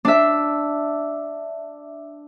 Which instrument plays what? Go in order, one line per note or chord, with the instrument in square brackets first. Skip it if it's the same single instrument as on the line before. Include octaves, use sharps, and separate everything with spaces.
[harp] D4 E5